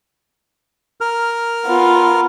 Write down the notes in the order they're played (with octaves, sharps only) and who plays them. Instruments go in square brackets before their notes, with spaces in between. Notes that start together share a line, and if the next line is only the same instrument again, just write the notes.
[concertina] A#4 F6
[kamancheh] B3 F4